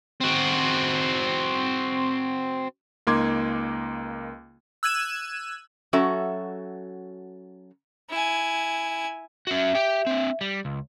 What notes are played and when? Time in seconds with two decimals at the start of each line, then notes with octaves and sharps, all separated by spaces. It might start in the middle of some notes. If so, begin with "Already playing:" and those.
0.21 C4 F#4
3.07 C#2 A#3 D#4 C6 D6 G#6
4.83 E6 F#6 G#6 D#7 E7
5.93 F#3 C#4 F#4 A4 E5
8.10 E4 G#5
9.47 C#4 F#4 E5
9.75 G4 G5
10.07 C4 D4
10.41 G3
10.65 C#2